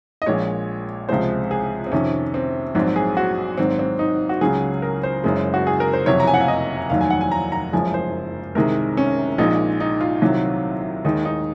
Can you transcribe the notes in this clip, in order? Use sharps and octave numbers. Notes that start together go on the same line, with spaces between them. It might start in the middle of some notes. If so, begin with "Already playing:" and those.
D#5
A#1 A#2 G#3 C#5
C#2 C3 F3 G#3 C5
G#4
C4
F2 C3 D#3 C#4
C4
A#1 G#2 F#3 C4
G#4
F#4
G#1 G#2 F#3 C4
C4
D#4
F#4
C#2 C#3 F#3 G#4
A#4
C5
F#1 F#2 C#3 G#3
F#4
G#4
A#4
C5
F#1 F2 C3 F#3 C#5
A#5
G#5
F#5
F5
D#5
F1 D#2 D#3 F#3 F5
G#5
F#5
G#5
A#5
A#5
F#1 F#2 F3 G#3 G#5
C5
C2 C3 D#3 G#3 A#4
C#4
A#1 A#2 G#3 D#4
D#4
F4
C2 C3 D#3 F#3
D#2 D#3 G#3 D#4
D#4